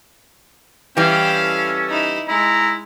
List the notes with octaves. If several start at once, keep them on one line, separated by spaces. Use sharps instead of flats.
E3 G3 C#4 E4 F5 G5
A4
D#4 E4
G#3 E4 A#5